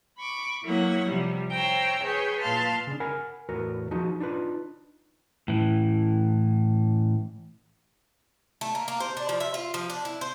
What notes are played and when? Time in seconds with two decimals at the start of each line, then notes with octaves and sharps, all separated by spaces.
0.17 B5 C#6 D6
0.64 F#3 A#3 E4 C#5 F#5
1.06 C3 F3 G3
1.52 C5 C#5 G5 A#5 E6
2.04 G#4 B4 C#5 G5
2.40 A#2 B4 F5 A5 C6 F6
2.87 C#3 D4
3.00 A#4 F#5 G#5 B5
3.49 E2 A2 F#4 A#4 B4
3.91 F3 D#4 F#4 G#4
4.20 D4 D#4 F4 B4
5.48 A2 E3
8.61 A3
8.75 A#3
8.88 A#3
9.00 C5
9.17 D4
9.29 F3
9.40 E5
9.54 F4
9.74 F3
9.90 D4
10.05 E4
10.21 C5